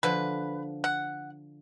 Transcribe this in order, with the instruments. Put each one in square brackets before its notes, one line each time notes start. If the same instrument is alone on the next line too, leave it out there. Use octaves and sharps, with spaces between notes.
[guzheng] D3 F3 [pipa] B4
[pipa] F#5